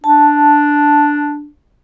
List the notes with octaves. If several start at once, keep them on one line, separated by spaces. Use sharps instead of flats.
D4 A5